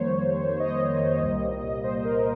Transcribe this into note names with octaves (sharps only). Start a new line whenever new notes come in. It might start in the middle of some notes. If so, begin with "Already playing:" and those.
Already playing: F2 D#3 G3 A#3 C5 C#5
D#5
C2 A#2 G3 A#3
C5
A#4